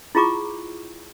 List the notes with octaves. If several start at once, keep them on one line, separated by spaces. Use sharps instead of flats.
E4 F4 G#4 A#5 C#6 D6